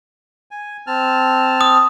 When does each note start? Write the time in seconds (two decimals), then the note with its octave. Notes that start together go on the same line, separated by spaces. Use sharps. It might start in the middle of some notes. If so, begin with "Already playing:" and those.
0.51 G#5
0.87 C4 A5 F6
1.61 D#6